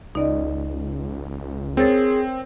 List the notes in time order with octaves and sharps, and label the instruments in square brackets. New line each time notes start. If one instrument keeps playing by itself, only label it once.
[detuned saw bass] C#2 [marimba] D#4 D5 D#5
[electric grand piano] C4 [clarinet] G#4 [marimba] A#4 C#5 A6